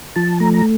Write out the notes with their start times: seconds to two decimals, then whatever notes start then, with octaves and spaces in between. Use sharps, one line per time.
0.16 F3 A5
0.40 A3 A#5
0.54 A#5